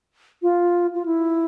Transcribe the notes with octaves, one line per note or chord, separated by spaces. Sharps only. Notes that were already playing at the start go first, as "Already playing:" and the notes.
F4
F4
E4